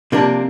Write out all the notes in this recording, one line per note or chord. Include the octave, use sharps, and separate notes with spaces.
C3 F3 A#3 D4